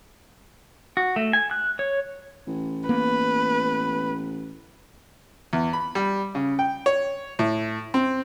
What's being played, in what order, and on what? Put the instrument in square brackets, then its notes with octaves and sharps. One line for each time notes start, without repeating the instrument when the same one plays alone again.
[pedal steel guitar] F#4
A3
G#5
F#6
C#5
[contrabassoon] A1
[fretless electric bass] A#3 B3 [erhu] B4
[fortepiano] E2
B5
G3
C#3
G5
C#5
A2
C4